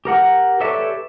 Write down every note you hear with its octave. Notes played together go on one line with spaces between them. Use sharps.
G4 A#4 F#5
G4 A4 B4 C#5 D5 E5